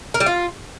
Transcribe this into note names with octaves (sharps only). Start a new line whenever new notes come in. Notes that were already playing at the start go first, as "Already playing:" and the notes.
A#4
G3
F4